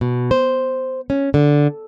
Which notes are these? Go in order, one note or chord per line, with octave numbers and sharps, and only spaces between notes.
B2
C5
C#4
D3